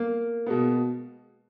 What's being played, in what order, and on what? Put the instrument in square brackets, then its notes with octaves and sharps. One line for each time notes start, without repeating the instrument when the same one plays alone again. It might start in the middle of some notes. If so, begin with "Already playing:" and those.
Already playing: [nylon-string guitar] A#3
[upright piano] B2 G#3 B3